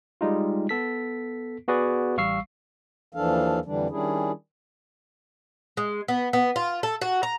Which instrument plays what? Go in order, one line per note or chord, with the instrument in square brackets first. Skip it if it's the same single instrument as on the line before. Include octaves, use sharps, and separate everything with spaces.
[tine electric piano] G3 G#3 D#4 F4
B3 A4 B6
B3 F#4 G#4 B4 D5
A1 G3 F5 C#6 E6 C7
[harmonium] D#2 E3 F3 D4 A4 F5
F2 D3 E3 G3 D4
D#3 G3 C#4 D4 E4 G#4
[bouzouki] G#3
B3
B3
F4
A4
F#4
A#5